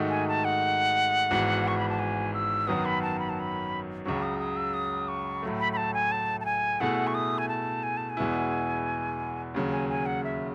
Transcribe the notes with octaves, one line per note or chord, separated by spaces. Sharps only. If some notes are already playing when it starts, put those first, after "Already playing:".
Already playing: G#2 D#3 A3 D#4 F#4
G#5
A5
F#5
G#1 G#2 E3 B3 F#4
C#6
B5
A5
G#5
E6
F#2 D#3 F#3 B3 D#6
B5
A5
B5
A5
B5
C#2 C#3 F#3 C#6
D#6
D#6
E6
D#6
C#6
A2 F#3 A3
B5
B5
A5
G#5
A5
A5
G#5
B2 A3 E4 G#4 F#5
C#6
D#6
G#5
A5
G#5
A5
G#5
E2 B2 G#3 B3 E4
D#2 C#3 F#3
G#5
G#5
F#5
E5